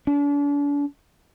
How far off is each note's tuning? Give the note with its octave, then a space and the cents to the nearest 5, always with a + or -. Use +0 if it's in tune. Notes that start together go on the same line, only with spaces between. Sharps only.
D4 -40